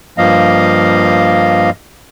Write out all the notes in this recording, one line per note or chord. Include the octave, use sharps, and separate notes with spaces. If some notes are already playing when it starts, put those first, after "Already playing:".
G2 F3 A#3 D#5 F5